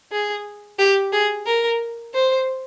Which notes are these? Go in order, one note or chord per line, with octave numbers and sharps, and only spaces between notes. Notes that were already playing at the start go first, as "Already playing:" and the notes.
G#4
G4
G#4
A#4
C5